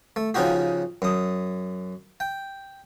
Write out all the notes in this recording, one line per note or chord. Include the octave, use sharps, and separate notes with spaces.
A3
C#3 F3 C#4 D#4 F#4 G4
F#2 D#6
G5